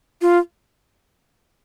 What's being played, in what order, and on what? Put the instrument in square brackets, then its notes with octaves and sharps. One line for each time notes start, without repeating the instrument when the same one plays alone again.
[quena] F4